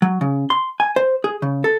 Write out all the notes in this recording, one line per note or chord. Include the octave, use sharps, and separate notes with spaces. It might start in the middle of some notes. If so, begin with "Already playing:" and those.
F#3
C#3
C6
G#5
C5
G#4
C#3
A4